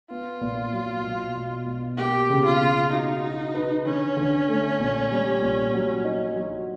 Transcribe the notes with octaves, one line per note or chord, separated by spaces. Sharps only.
B3 F4
A#2
F#3
B2
B2
B2
A#3 G4
C#3
F4
C#3
D#4 F#4
F#4
B4
D3 C#4
D3
A3
A#2
G3
A#2
F#3
D#4
F#3